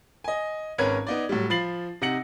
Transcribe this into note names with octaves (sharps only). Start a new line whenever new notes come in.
D#5 G#5
G#1 C#4 A#4 B4 C#5 G#6
B3 D#4 D5
A2 F#3 G3
F3 B5 A6 C7 F#7
C3 D#4 F#5 A#6 C#7 F#7